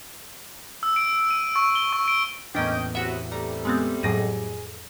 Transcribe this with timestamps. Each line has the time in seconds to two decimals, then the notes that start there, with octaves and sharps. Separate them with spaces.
0.83 E6
0.96 D7
1.31 D#7
1.56 C#6
1.75 G7
1.93 C#6
2.08 D7
2.55 E2 A2 A#3 C#4 D4 D#5 G5
2.95 C3 F#3 B3 F#4 E5
3.32 C3 G3 A3 A#5
3.65 G#3 B3 C4
4.03 F2 A2 F#3 G#4 A#6 D#7